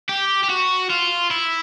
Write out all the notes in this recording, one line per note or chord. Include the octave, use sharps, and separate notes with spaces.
G4
G4
F#4
F4
E4